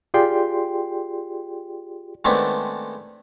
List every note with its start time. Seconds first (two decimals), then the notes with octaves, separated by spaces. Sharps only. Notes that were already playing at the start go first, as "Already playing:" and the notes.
0.14 F4 G4 G#4 D5 G5 C6
2.25 D#3 G#3 A3 B3 C4 D4